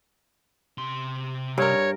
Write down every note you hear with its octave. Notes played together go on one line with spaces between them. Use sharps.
C3 C6
G2 A#4 C#5